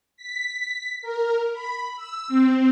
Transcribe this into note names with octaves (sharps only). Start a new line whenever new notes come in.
B6
A#4
B5
E6
C4